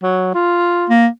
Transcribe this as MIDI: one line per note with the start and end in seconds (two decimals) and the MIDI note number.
0.03 0.33 54
0.35 0.89 65
0.90 1.07 58